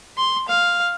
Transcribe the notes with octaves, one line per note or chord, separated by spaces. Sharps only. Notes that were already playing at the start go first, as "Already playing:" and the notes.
C6
F5